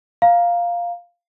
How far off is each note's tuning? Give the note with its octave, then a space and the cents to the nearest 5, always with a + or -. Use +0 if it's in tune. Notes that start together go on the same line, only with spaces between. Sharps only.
F5 +0 A#5 +0